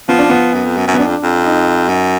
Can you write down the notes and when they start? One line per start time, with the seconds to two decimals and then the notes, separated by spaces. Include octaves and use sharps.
0.08 F3 B3
0.19 D4
0.30 B3
0.54 F#2
0.65 F2
0.77 F#2
0.87 F#2
0.94 B3
0.99 F#2 D4
1.07 F2
1.23 F2
1.44 D#4
1.89 F#2